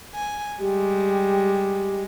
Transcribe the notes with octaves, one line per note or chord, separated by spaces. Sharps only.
G#5
G3 G#3 G4